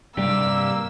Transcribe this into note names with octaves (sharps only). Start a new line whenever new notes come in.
G2 C3 G3 A#3 D4 G4 E6